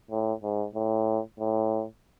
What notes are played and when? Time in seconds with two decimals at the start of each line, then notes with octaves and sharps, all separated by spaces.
0.10 A2
0.43 G#2
0.75 A2
1.39 A2